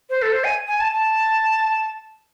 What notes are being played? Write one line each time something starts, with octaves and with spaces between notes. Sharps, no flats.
C5
A4
C5
G#5
G#5
A5
A5